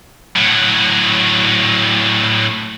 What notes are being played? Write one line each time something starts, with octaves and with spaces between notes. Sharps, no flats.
A2 F#3